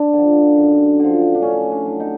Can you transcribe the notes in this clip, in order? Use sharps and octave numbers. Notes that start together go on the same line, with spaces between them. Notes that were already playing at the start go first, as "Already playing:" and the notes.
Already playing: D4
D3 F3
F#2
D3 F3
D4
A2 C#4
D4
F#3
D#4